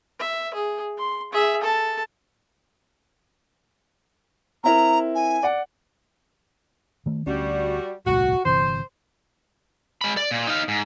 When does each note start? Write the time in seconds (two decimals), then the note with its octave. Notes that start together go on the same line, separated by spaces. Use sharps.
0.19 E5
0.54 G#4
0.97 C6
1.32 G#4 E5
1.61 A4 A5
4.64 C4 E4 A#4 A#5
5.15 G#5
5.43 D5 F#5
7.06 D#3 A3
7.27 D2 G3 C#4 F#4
8.06 D#1 C2 A2 F#4
8.46 G1 C3 E3 C5
10.01 G#3 B5
10.17 D5
10.31 A#2
10.47 D#4 F5
10.68 G#2